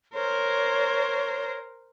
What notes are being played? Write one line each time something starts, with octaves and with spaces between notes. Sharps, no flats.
A#4 C5 C#5